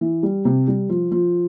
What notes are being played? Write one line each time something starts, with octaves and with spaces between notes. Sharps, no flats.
E3
G3
C3
G3
F3
F3